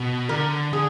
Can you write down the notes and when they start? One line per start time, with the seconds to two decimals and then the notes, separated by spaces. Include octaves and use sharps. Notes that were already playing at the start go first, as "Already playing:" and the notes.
Already playing: B2
0.29 D3 A#4
0.73 D3 G#4